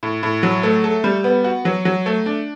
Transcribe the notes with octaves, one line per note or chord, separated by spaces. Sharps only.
A2
A2
F#3
A3
A4
G3
B3
F#4
F#3
F#3
A3
D4